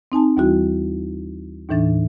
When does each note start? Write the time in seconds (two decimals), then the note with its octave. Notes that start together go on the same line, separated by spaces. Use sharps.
0.12 C4 D#4 G#5 A5
0.37 D#2 E3 G3 E4 F#4
1.69 D#2 A2 E3 D4 A6